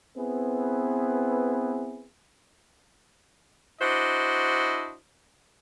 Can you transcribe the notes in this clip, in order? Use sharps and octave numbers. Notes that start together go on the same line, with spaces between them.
B3 C4 E4 G#4 B4
D4 E4 F#4 C5 D#5